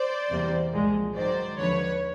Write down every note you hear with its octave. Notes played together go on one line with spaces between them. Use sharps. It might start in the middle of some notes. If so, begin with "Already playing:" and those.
Already playing: C5 D5
E2 C3 E3 G3 A#3
C2 A#2 F3 G#3
G#2 D#3 F#3 C5 D5
D#2 D3 F3 B4 C#5